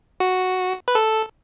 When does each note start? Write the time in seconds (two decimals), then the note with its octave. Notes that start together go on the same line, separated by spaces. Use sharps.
0.20 F#4
0.88 B4
0.95 A4